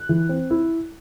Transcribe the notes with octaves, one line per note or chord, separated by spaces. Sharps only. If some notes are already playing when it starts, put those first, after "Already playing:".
Already playing: F#6
E3
C4
E4